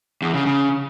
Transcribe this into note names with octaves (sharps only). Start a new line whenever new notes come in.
E2
C#3
C#3